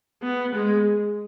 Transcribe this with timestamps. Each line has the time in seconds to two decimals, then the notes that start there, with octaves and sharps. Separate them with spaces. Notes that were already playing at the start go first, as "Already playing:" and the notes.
0.22 B3
0.54 G#3